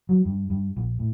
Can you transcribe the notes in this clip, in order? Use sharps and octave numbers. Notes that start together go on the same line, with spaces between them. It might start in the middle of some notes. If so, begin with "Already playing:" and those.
F#3
G2
G2
A#1
A2